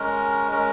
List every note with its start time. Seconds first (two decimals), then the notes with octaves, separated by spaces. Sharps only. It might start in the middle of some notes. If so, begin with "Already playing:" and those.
Already playing: G#3 C#4 A#4
0.52 G#3 C#4 A#4